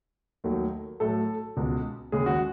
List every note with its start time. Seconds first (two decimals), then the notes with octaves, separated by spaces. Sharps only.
0.44 D#2 D#3 F#3 A3
1.00 A2 F#3 A3 A4
1.56 C#2 B2 G#3
2.12 D#2 C#3 G#3 G#4
2.26 F#4